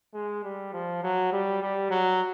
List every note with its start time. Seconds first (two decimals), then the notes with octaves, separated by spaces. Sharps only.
0.14 G#3
0.44 G3
0.73 F3
1.03 F#3
1.32 G3
1.62 G3
1.90 F#3